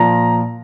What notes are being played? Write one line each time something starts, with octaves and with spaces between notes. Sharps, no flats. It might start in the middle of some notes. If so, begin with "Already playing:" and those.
Already playing: A#2 F3 A#5